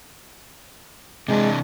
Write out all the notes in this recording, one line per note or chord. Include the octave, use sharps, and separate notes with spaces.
C3 E3 G#3 D4